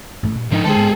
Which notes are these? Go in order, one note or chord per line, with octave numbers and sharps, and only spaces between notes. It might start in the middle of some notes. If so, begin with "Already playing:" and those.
A1 G#2 A3
G2 A#2
G#2 F3 D4 D#4
D3 D#3 G#3 C4 G#4 A4
G#2 B3